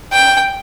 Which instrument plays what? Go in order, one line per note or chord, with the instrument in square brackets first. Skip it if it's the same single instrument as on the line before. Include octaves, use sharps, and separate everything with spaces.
[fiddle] G5